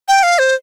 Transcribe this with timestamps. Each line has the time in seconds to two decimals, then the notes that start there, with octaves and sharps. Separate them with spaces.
0.08 G5
0.23 F5
0.39 C5